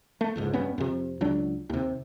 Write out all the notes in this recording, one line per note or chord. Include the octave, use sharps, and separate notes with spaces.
A3
F#1 C#2 G#2
F1 G2 B3 C#4
F2 C3
C#2 F#3 D4
D#2 C3